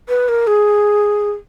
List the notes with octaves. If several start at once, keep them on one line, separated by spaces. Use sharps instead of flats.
B4
A#4
G#4